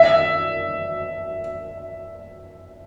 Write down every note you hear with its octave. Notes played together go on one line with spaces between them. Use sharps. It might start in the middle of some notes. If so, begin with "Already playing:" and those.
Already playing: E5